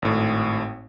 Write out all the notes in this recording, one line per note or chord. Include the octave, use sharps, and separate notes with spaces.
G#1 A2